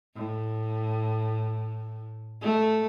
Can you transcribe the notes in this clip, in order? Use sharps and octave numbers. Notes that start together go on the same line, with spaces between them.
A2
A3